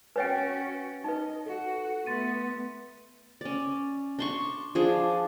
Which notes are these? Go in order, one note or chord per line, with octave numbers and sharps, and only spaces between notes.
C#4 F#4 B4 C#5 G5 G#5 A6 D7
D#4 B4 D#5
F#4 A4 F#5
A3 B3 C6 A6 D#7
C#4 D5
D4 C6 C#6
F3 D4 G#4